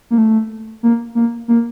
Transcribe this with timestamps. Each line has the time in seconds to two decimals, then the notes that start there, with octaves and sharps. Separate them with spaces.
0.11 A#3
0.18 A3
0.83 A#3
1.15 A#3
1.48 A#3